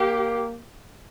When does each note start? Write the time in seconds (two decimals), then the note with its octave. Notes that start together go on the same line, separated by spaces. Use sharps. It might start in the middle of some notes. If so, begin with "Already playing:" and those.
Already playing: A#3 G4